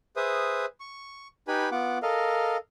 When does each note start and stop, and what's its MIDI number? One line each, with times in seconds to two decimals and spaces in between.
0.16 0.66 68
0.16 0.66 71
0.16 0.66 72
0.16 0.66 76
0.16 0.66 87
0.80 1.28 85
1.48 1.69 63
1.48 1.69 67
1.48 1.69 71
1.48 1.69 80
1.48 1.69 83
1.71 1.98 59
1.71 1.98 65
1.71 1.98 78
1.71 1.98 86
2.03 2.57 69
2.03 2.57 70
2.03 2.57 75
2.03 2.57 77